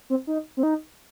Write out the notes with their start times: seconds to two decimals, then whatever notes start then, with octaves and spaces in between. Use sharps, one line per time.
0.10 C4
0.27 D#4
0.57 C4
0.63 D#4